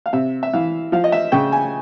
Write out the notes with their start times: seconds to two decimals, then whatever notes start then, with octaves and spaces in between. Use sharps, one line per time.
0.06 F5
0.13 C3 E5
0.43 E5
0.53 E3 F5
0.92 F3 F5
1.04 D#5
1.12 E5
1.32 C#3 G5
1.52 G#5